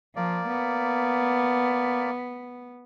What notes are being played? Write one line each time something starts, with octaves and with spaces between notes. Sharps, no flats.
F3 A#3 D5
B3